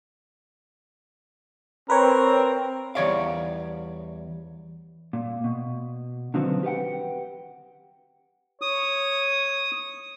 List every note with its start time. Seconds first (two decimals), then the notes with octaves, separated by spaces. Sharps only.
1.90 C4 A#4 B4 C#5
2.95 E2 G3 C#5 D5 F5
5.13 A#2
5.44 B2
6.34 D3 D#3 F3 F#3 B3 C4
6.63 G4 B4 D#5 F#5 G5
8.62 C#5 D#6